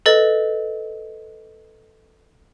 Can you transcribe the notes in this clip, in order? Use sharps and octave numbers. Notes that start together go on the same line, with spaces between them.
A4 B4 D#5 A6